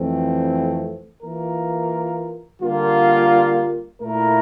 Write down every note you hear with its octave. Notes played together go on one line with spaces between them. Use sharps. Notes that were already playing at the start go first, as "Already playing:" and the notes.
Already playing: F2 E3 A3 C4
E3 A#3 F4 A#4
D3 G3 A#3 F4
A#2 A3 E4 A#4